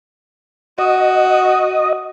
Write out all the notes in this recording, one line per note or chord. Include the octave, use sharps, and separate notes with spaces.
F#4 D#5